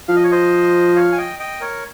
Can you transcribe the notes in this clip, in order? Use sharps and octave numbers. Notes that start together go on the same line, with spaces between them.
F3 F5
D#5
C#5
C5 D#5
C#5 F5
G#5
D#5 G5
D#5 G5
A#4 C#5